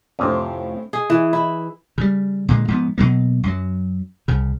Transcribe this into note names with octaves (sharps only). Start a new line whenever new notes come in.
F2 A2 C3 C4 C#4
G#4
E3
E4
C#3 G3
A#2 D3 G#3
G#2 F3 B3
B2 F#3 A#3
F#2 F#3
C2 C#3